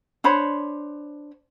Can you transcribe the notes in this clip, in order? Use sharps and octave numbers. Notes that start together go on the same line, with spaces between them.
D4 C5 C#5 B5